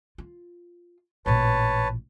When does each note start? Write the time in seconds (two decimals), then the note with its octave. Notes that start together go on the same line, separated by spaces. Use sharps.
0.18 F4
1.26 A1 A#2 B4 C#5 A5